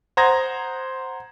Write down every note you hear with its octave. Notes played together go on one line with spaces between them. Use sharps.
C5 F#5 A#5 D#6 G#6 A#6